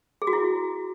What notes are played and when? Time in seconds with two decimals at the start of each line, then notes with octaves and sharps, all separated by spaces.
0.22 G#4
0.27 F#4
0.33 E4